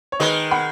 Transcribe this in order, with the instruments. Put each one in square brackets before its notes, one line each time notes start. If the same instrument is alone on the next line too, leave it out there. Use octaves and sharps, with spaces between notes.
[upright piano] C#5
[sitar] D#3 G#3 [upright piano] B4 D#5
[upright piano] F#5 B5